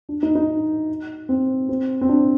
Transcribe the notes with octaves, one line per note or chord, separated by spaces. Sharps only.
D4
D#4
D#4
C4
C4
C4
D4